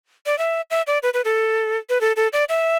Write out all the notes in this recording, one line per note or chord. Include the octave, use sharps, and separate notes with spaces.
D5
E5
E5
D5
B4
B4
A4
B4
A4
A4
D5
E5